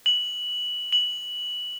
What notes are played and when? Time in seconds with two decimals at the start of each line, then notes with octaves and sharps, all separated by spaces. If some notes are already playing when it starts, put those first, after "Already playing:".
0.06 F#7
0.93 F#7